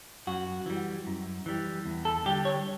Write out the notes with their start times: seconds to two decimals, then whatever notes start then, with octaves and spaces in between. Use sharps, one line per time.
0.27 F#2 F#4
0.66 E3 G3
1.07 F#2
1.46 E3 G3
1.86 E2
2.05 A4
2.25 D3 G3 G4
2.45 C#5